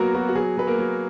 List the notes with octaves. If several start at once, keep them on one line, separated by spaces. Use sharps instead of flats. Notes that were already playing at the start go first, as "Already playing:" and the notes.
Already playing: F#3 A#3 B3 F#4 A#4
B3 F#4
F#4
F#3 G#4
F#3 B4
A#3 A#4
F#3